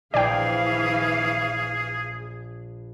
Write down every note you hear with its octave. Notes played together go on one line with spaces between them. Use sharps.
A#1 E3 G#4 D5 F5 G5